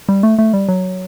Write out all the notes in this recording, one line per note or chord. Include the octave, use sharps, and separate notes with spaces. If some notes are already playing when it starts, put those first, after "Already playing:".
G3
A3
A3
G3
F#3